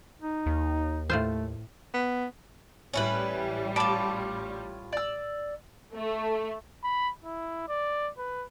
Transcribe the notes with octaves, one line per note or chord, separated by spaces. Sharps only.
D#4
D#2
A2 A3 F4 C5
B3
A1 G3 C#4 E4 B4
A2 F4 A5 B5 D6
D5 E6
A3
B5
E4
D5
B4